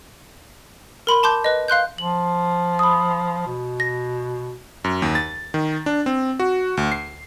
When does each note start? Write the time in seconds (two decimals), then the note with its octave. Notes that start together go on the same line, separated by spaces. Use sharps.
1.07 A#4 B5 C6
1.23 A5 C6 D6 G6
1.44 B4 D#5
1.68 F5 C6 F#6 G6
1.98 F3 F#7
2.79 B5 D#6
3.46 B2
3.80 A#6
4.84 F#2
5.02 D#2
5.15 A6
5.54 D#3
5.86 D4
6.06 C4
6.40 F#4
6.77 D2
6.92 C7